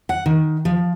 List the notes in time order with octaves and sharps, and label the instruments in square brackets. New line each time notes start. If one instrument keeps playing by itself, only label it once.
[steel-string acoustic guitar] F#5
D#3
F3